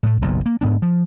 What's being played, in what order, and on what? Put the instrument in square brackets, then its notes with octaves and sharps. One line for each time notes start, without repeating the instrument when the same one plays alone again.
[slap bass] A2 A3
F#1 B1 A#2
A#3
G#2 B3 D4
F3